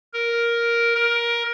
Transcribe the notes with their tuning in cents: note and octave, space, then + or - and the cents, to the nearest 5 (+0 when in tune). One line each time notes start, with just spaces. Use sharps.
A#4 +5
A#4 +15